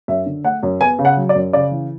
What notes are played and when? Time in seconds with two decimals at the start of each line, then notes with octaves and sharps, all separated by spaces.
0.08 F#2 E5
0.26 D3
0.44 A3 F#5
0.63 F#2
0.81 B3 G#5
0.99 C#3
1.05 F#5
1.17 F#3
1.29 D5
1.35 F#2
1.53 C#3 D5
1.71 E3